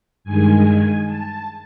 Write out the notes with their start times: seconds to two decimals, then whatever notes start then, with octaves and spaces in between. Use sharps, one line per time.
0.24 G2 D#3 G#3 G#5
1.06 A5